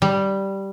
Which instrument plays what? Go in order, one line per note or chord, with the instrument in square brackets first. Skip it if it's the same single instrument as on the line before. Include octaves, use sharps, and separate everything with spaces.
[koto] G3